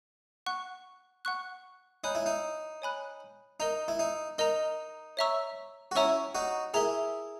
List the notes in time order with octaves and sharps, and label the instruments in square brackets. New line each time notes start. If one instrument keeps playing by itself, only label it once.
[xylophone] F#5 C#6 F#6
F#5 C#6 F#6
[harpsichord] D#4 [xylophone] C#5 G#5 B5 F#6
[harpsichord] E4
D#4
[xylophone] C#5 G#5 B5 F#6
[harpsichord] D#4 [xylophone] A#4 D#5 A#5
[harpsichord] E4
D#4
[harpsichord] D#4 [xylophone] A#4 D#5 A#5
[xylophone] C#5 E5 A#5 C#6 E6
[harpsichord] F#4
[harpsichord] C#4 E4 [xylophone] C#5 E5 A#5 C#6 E6
[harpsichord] D#4 F#4
[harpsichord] E4 G#4 [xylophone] A#4 E5 A#5